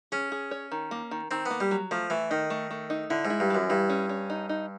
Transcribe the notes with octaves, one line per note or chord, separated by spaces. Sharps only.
C#4 G#4
G#4
C#5
D#3
A#3
D#3
D#3 C4
A#3 B3
G3
F#3
F3 A3
E3 A3
D#3 D#4
A3
A3
D#4
D3 E4
G#2
E4
G2
F#2 E3
G2 E4
C#4
C#4
D#4
D#4